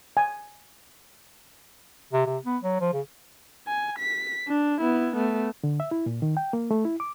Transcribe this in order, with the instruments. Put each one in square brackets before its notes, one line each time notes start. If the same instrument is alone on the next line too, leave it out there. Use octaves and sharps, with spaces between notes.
[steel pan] G#5
[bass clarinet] C3
C3
B3
F#3
F3
C#3
[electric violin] G#5
B6
D4
B3 E4
A3 B3
[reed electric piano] D3
E5
E4
A#2
D#3
G5
A#3
A3
E4
D6